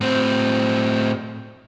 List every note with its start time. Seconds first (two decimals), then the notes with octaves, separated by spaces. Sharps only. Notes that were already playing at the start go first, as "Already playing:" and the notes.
0.01 A2 C4